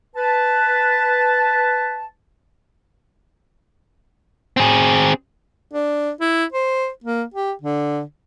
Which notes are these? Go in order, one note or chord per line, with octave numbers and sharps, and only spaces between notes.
B4 A5
C4 G#4
D4
E4
C5
A#3
G4
D3